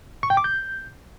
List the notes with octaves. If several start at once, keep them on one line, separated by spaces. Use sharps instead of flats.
C#6
G5
D6
G6